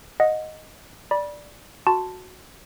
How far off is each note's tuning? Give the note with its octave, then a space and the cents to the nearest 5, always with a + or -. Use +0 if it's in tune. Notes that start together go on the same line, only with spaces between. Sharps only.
D#5 +0 F#5 -25
D5 +0 B5 -30
F#4 -5 A5 +0 C6 -10